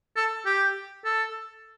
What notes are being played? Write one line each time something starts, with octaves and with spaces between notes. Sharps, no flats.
A4
G4
A4